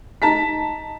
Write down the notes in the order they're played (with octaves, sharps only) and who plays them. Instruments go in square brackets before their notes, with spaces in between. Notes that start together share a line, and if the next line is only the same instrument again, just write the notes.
[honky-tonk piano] D#4 A5 A#5 B6